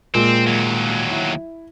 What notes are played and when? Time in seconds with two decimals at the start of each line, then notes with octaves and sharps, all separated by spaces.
0.15 A#2 G#3 A#3 C4
0.47 D#2 F#3
1.10 E4